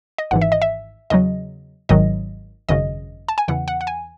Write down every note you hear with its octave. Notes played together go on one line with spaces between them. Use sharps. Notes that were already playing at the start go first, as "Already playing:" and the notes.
D#5
G#1 G#2 E3 F#5
E5
D#5
E5
E2 C#3 F#3 D#5
G#1 G#2 D#3 F#3 D#5
G#1 F#2 C#3 D#5
A5
G#5
E2 C#3 E3 F#5
F#5
F#5
G#5